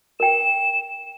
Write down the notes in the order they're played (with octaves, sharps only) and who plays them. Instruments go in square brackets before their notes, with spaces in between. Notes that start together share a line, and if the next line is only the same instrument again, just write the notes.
[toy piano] A#4 G5 [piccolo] E7